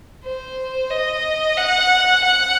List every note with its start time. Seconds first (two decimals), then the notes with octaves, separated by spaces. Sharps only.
0.24 C5
0.90 D#5
1.57 F#5
2.24 F#5